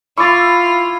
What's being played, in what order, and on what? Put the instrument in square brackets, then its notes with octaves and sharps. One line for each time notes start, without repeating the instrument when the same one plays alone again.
[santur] E4 [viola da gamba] F4 [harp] C#6 D6 A6